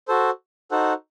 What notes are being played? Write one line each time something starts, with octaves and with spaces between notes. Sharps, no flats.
F#4 A4 C5
D#4 F#4 A4 C5 F#5